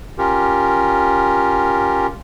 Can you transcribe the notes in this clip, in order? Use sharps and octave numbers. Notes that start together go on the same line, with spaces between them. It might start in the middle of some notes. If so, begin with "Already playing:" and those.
C#4 F4 G4 A#4